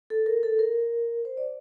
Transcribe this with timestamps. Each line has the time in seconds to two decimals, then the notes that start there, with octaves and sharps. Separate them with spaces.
0.10 A4
0.26 A#4
0.43 A4
0.59 A#4
1.25 C5
1.37 D5